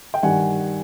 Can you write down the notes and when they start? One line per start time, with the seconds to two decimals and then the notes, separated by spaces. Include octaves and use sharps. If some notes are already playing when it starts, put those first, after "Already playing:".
0.14 G5
0.23 G2 D#3 G3 F#5 G#5